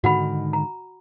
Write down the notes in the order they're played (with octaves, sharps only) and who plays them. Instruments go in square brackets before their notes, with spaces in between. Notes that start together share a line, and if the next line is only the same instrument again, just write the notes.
[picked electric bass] G#2 D3 D#3 [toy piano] F#4 F#5 B5
[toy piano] A#5